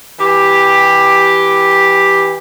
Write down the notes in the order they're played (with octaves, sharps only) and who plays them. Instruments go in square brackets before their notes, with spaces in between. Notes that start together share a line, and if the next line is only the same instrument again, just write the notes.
[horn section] E3 G4